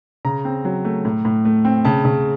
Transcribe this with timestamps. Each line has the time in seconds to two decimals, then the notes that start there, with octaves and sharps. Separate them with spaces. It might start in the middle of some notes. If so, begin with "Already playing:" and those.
0.25 C#3 A#5
0.45 C4
0.65 F#3
0.85 A3
1.05 A2
1.25 A2
1.45 A3
1.65 C4
1.85 C#3 A5
2.05 C#3